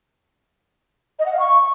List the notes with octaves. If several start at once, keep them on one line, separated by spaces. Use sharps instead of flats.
D#5
F#5
F5
C#6